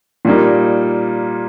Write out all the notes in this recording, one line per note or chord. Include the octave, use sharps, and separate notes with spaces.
A#2 G3 A#3 D#4